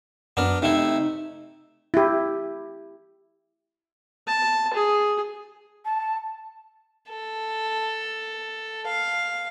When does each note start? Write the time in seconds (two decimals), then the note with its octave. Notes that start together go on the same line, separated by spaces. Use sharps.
0.37 F#2 B3 D4 A#4
0.62 C3 A3 D#4 E4
1.94 E4 G4
4.27 A5
4.74 G#4
5.85 A5
7.09 A4
8.87 F5